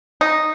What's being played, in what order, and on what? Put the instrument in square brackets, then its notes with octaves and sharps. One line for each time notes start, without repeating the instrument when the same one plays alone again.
[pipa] D#4